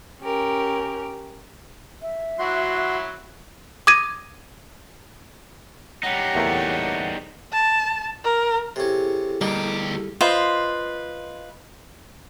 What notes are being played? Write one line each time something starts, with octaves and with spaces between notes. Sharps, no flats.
C#4 G4 A#4
E5
F#3 E4 F#4 C6
D6 D#6 G#6 A#6 D#7
G3 D#4 G4 C#5 F#5
E2 A3 A#3
A5
A#4
C3 C#4 E4 G#4 A4
D2 G3 A#3 D#4 G4
F4 B4 C5 D#5